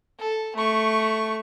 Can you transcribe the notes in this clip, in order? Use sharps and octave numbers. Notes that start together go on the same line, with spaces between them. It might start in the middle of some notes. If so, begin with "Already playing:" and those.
A4
A3 C#6